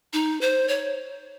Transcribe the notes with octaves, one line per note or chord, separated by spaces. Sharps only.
D#4
C5
C#5